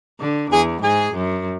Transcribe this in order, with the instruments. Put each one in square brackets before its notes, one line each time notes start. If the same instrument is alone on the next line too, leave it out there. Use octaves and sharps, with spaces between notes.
[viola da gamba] D3
[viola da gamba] E2 [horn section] G#4
[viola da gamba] G#2 [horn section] G#4
[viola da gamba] F#2